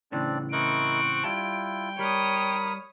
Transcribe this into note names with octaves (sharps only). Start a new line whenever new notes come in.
A2 C#3 E3 C4 D4 D5
C4 E4 A#4 D#5 F#5 C#6 D7
G3 E4 F4 G5 A5
G3 A#4 C#5 B5 D#6